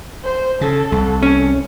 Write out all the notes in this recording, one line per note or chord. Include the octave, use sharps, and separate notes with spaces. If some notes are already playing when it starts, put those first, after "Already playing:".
C5
C#3 A4
C2
C#4